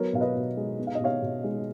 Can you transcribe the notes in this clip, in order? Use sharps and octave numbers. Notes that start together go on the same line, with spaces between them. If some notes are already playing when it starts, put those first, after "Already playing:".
Already playing: F#3 B3 A#4 C#5
B2 F5
B4 D#5
B2
G#3
B3
F5
D#5
B2 C#5 F5
B2
G#3